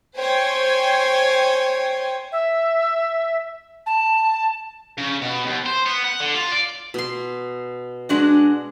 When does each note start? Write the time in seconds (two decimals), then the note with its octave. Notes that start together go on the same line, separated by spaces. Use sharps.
0.16 C5 C#5 G5 G#5 G#6
2.32 E5
3.86 A5
4.98 C#3
5.21 B2
5.46 D#2
5.66 C5
5.86 B3
6.04 F#5
6.20 D3
6.35 F4
6.52 D5
6.94 B2 C6
8.09 G#3 D4 F#4